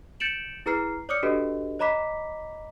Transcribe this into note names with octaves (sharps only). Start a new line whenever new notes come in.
G6 A6 C#7 D7 E7 F#7
E4 G#4 B4 A#5 F6 C7
C#5 D5 D6 D#6 F6 C#7
D4 F#4 G4 A4 B4 D#5
C#5 D#5 A#5 B5 D6 B6